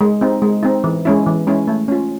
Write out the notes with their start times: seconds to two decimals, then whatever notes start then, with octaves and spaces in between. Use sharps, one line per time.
0.01 G#3
0.21 C4 D#4
0.42 G#3
0.63 C4 D#4
0.84 E3
1.05 G#3 C#4 E4
1.26 E3
1.47 G#3 C#4 E4
1.68 A3
1.88 C#4 F4